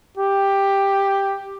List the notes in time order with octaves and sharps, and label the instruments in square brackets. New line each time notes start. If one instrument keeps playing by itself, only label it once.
[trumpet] G4